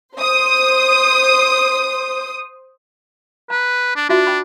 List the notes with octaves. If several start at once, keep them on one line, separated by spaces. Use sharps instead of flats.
C5 D#6
B4 A#5
D4
D4 F4 F#4 E5
G5 B5